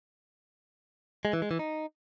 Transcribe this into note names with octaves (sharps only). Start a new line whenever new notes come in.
G#3
E3
G#3
E3
D#4